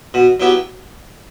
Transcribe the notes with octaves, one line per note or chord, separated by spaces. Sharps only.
B2
F#3 B3 E4 G4